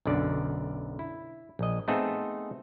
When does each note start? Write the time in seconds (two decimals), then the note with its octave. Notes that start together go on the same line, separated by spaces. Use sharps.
0.05 B1 F#2 D3 D5
0.99 E4
1.59 A#1 D#5
1.88 A3 B3 C4 D#4 G#4 A4